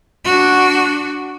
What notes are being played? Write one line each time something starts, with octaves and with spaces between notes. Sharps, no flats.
D4 F#4